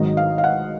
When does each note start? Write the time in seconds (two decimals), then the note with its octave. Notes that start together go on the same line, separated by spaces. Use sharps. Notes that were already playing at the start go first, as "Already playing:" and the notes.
Already playing: G#1 G#2 D#3 F#3 D#5
0.17 F5
0.38 F5
0.44 F#5